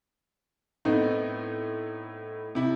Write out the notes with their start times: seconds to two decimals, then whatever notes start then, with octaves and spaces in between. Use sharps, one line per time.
0.85 A2 A3 B3 C4 D#4
2.55 C3 E4